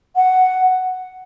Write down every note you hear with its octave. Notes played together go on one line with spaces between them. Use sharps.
F#5